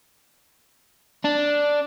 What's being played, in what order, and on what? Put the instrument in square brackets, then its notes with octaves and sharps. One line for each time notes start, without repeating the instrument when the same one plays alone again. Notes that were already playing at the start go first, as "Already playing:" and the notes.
[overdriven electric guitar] D4